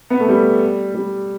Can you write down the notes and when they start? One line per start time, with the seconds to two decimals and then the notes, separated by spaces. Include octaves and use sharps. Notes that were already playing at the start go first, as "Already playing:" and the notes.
0.10 B3
0.20 A3
0.29 G3
0.94 G3